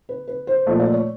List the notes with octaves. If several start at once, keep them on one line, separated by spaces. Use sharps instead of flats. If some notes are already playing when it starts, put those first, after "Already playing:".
B4
B4
C5
A#2 F3 A3 D#5
D5
C#5